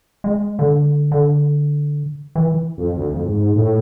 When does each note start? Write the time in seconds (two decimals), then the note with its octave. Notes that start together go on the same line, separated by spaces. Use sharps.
0.24 G#3
0.59 D3
1.12 D3
2.35 E3
2.78 F2
2.96 D2
3.13 F2
3.26 G#2
3.56 A2